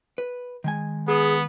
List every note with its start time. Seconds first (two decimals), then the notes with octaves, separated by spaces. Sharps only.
0.18 B4
0.64 D#3 G#3 G#5
1.08 B3 G#4